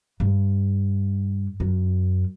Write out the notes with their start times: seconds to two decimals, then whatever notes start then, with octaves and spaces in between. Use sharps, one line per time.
0.20 G2
1.60 F#2